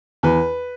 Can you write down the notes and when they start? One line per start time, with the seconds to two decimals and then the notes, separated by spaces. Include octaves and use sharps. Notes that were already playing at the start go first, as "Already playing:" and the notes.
0.23 E2 B4